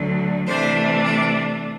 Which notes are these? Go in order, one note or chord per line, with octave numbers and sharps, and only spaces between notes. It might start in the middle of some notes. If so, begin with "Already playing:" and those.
Already playing: D2 D3 F#3
C3 E3 A3 D4 C5
D5